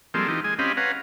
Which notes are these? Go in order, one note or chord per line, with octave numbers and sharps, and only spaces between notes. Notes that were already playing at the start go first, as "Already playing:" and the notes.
F3 G3 G#3 A#3 C4 A4
E3 D#4 F4 G4
G#3 G#5
C4 C#4 G4 D#5 F5 B5
B4 C#5 F5 F#5 G#5 A#5